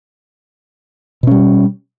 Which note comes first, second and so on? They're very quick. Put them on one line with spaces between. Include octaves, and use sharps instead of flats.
B2 C#4 G3